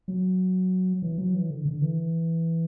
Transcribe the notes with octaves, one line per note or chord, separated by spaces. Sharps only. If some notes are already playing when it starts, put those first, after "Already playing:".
F#3
E3
F#3
E3
D3
D3
E3